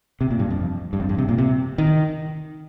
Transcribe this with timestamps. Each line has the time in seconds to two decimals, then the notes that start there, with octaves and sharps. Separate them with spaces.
0.21 C3
0.30 A#2
0.39 G2
0.50 F2
0.93 G2
1.00 F2
1.09 G2
1.18 C3
1.29 A#2
1.38 C3
1.78 D#3